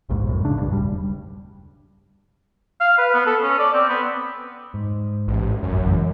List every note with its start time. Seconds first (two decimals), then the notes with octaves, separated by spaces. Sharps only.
0.09 A#1 D#2 G#2
0.29 F#2 A2
0.45 C#3 D4
0.58 B1 G2
0.70 E1 G3
2.80 F5
2.98 B4
3.14 B3
3.26 A4
3.43 C#4
3.59 D5
3.74 C4
3.89 B3
4.74 G#2
5.27 A1
5.62 F1 F#2
5.86 C#3 E3 G#3